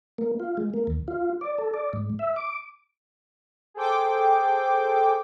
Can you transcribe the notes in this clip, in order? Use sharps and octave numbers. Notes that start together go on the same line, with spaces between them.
A#3
F4
G#3
A#3
D#2
F4
D5
A4
D5
G#2
E5
D6
G#4 A4 C5 G5 D6